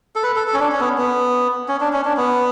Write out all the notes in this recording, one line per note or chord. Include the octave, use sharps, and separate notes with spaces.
A4
B4
A4
A4
C#4
D4
C#4
B3
B3
C#4
D4
C#4
D4
B3